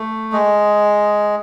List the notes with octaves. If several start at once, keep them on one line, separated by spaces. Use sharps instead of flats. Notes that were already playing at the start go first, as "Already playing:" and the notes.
Already playing: A3
G#3